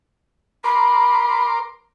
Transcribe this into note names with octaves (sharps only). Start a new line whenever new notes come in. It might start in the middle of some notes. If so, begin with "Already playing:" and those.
A#4 B5 C6 D6